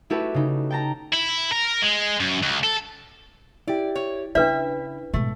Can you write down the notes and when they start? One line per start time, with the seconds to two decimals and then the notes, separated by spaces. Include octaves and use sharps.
0.10 A3 E4 F#4 G4 A4 B4
0.34 C#3 D#4
0.70 G5 A5 A#5
1.13 E4
1.52 A#4
1.82 G#3
2.20 F#2
2.43 C#2
2.64 A4
3.68 E4 G4 D5
3.95 C#5
4.35 C#3 D4 E4 B4 C#5 E5
5.14 G#2 B2 A3